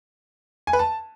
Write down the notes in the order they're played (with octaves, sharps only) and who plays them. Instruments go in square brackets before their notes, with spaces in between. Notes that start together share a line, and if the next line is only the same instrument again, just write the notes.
[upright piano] G#5
B4
A5